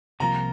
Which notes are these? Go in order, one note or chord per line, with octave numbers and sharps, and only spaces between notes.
C2 C3 F3 A#3 F4 A#5